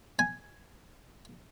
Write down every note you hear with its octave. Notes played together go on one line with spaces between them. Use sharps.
G#5